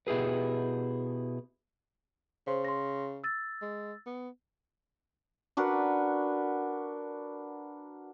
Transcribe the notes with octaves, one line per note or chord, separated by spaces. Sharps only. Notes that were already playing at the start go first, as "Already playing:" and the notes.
B2 E4 G4 G#4 B4
C#3 C5 C6
C6 A#6
E6 A6
G#3
B3
D4 F#4 A#4 B4